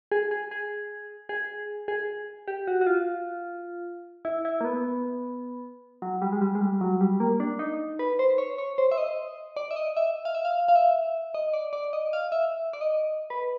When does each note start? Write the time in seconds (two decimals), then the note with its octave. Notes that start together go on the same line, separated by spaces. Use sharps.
0.12 G#4
0.31 G#4
0.51 G#4
1.29 G#4
1.88 G#4
2.48 G4
2.67 F#4
2.81 F#4
2.87 F4
4.25 E4
4.45 E4
4.61 A#3
4.65 B3
6.02 F#3
6.22 G3
6.32 G#3
6.41 G3
6.55 G#3
6.61 G3
6.81 F#3
7.01 G3
7.20 A#3
7.40 D4
7.59 D#4
7.99 B4
8.19 C5
8.38 C#5
8.58 C#5
8.78 C5
8.91 E5
8.98 D#5
9.56 D5
9.71 E5
9.76 D#5
9.97 E5
10.25 F5
10.35 E5
10.45 F5
10.68 F5
10.75 E5
11.34 D#5
11.53 D5
11.73 D5
11.93 D#5
12.13 F5
12.32 E5
12.73 D5
12.81 D#5
13.30 B4